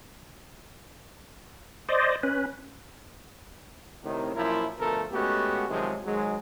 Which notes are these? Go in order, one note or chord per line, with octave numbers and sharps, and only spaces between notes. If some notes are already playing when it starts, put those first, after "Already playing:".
C5 D5 D#5
C#4 B4
A2 C3 D#3
F#2 A#2 F3 E4 F4 A#4
D2 B2 F3 A3 A4 A#4
G#3 A3 B3 C#4 F#4 G4
C3 D#3 F3 F#3 G#3
G#2 D#3 F#3 G#3